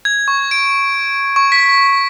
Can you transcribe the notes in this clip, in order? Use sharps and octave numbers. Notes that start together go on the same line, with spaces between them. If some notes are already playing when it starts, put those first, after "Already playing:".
G#6
C#6
D7
C#6
B6